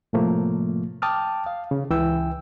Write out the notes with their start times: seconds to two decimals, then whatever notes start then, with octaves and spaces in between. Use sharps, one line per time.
0.13 A2 C3 F3 A3 A#3
1.02 G5 A5 D6 D#6 F6
1.46 F5
1.71 C#3
1.90 C#2 E3 G5 E6